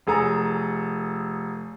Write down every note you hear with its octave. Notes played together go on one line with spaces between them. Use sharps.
F1 G#4 A4 A#5 D#6